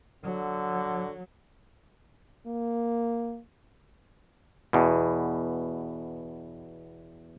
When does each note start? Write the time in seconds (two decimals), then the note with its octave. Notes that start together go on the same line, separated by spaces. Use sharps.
0.25 D3 F#3
2.47 A#3
4.73 E2 B2